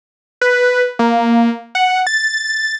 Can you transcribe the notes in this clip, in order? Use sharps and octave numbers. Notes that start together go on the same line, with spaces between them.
B4
A#3
F#5
A6